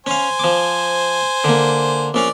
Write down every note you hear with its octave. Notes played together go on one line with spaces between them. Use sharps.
C#4 C5 F5 G#5
F3 D6
D3 A#3
A#1 C#4 D5 F5